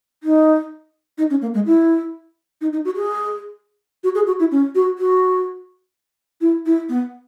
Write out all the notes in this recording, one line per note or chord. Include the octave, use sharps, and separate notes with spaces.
D#4
D#4
C#4
A#3
G#3
E4
D#4
D#4
F#4
G#4
F#4
G#4
F#4
E4
C#4
F#4
F#4
E4
E4
B3